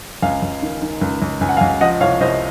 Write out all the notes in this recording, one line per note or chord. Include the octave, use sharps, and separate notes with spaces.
C#2 F5 G#5
C#2
D#3
D#3
C#2
C#2
C#2 G#5
F#5
F5 G#5
C#2
F3 D#5 F#5
C2 C#5 F5
C2 C5 D#5